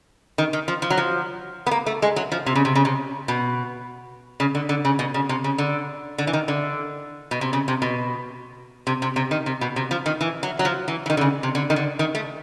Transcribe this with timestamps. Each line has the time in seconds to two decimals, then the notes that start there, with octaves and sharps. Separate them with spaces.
0.38 D#3
0.53 D#3
0.68 F3
0.82 F3
0.90 F#3
0.97 F3
1.67 B3
1.71 A#3
1.86 A3
2.02 G#3
2.16 F#3
2.32 F3
2.46 C3
2.55 C#3
2.65 C3
2.75 C#3
2.85 C3
3.28 B2
4.40 C#3
4.55 D3
4.69 D3
4.85 C#3
4.99 B2
5.14 C#3
5.29 C3
5.44 C#3
5.58 D3
6.18 D3
6.27 E3
6.33 D#3
6.48 D3
7.31 B2
7.41 C3
7.53 C#3
7.68 C3
7.82 B2
8.87 C3
9.02 C3
9.16 C3
9.31 D#3
9.46 C3
9.61 B2
9.76 C3
9.91 F3
10.06 D#3
10.21 E3
10.43 F#3
10.59 F#3
10.65 F3
10.88 E3
11.06 E3
11.10 D#3
11.17 D3
11.21 C#3
11.43 C3
11.55 D3
11.70 D#3
11.76 D3
11.99 D#3
12.15 A3